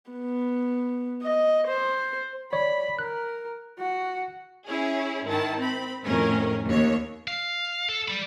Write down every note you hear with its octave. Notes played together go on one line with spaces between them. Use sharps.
B3
D#5
C5
C#5 D5 B5
A#4 F#6
F#4
C#4 E4 G#4 C#5
G#2 D#3 E4 A5
C4 B5
F2 A2 D#3 C#4 G#4 A#4
D#2 C#5
F5
A4
D5 B5